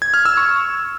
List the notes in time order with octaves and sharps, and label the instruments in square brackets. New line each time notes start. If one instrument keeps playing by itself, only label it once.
[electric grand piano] G#6
F6
E6
C#6